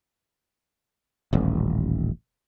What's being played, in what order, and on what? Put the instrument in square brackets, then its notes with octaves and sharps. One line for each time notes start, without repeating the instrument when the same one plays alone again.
[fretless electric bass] D#1 A1